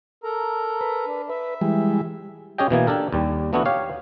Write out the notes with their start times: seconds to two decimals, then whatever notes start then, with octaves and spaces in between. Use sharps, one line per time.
0.24 A4 A#4 A#5
0.81 B4
1.06 D4
1.29 B4 E5
1.61 E3 G3 G#3
2.58 C#4 G4 G#4 D#5 G5
2.70 B2 E3 A#3 G#5
2.87 D4 G4 A4 A#4
3.12 D#2 G3
3.53 E3 A3 B3 D4 E4 F#4
3.65 G4 C#5 F5